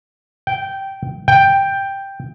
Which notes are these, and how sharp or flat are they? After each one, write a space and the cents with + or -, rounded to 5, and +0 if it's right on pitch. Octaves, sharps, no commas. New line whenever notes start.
G5 -10
G5 +5